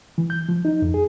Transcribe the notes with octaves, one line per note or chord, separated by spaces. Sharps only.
E3
G6
F3
D#4
F2
G#4